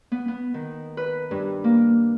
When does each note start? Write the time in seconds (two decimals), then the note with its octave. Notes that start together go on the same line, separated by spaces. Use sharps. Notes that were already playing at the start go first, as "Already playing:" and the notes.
0.12 B3
0.28 B3
0.54 D#3
0.97 B4
1.31 G2
1.64 A#3